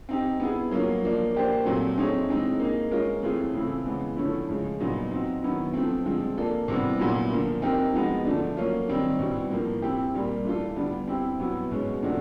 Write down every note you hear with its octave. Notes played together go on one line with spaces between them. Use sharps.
C4 D#4 G4
B3 E4 G#4
F#3 A#3 C#4 F4
F3 A#3 D4
A#3 D4 G4 C5
A#2 F#3 A3 C4
A3 C4 D#4 G#4 C#5
E3 G#3 C4 D#4
A#3 D#4 G#4
G#3 C#4 F4 A#4
E3 A3 C4 F4 G#4
C#3 E3 A3 C4 E4
C#3 E3 G#3 B3
D3 F3 A3 C#4 E4
C#3 F3 G#3
A#2 F#3 B3 D#4
C4 D#4 F#4
D#3 F#3 B3 E4
F3 A3 C4
D3 F3 G#3 C4
A#3 D4 F4 A4
C3 E3 G3 B3
A#2 F#3 B3 E4
D3 F3 A#3
C4 D#4 G4 A#4
F3 G#3 B3 D#4 F#4
D3 F3 A3 D4
F#3 A#3 C#4 F4
D#3 G3 C4 D#4
B2 G3 C4 E4
A2 F3 A#3
C4 E4 G4
A#2 G3 A#3
E3 A3 D4 F4 A4
D3 G3 B3 D4
C4 E4 G4
B2 F#3 B3 E4
B2 G#3 C#4
C3 F3 A3 D4 F#4